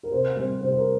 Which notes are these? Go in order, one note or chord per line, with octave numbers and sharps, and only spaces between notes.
A#4
C3 C5
G3 C4 C5
C3 C5
C5
A#4